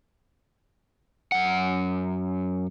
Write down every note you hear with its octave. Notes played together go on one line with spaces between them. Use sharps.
F#2 F#5